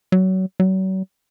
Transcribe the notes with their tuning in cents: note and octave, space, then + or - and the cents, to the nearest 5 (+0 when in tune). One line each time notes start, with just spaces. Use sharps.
F#3 +25
F#3 +40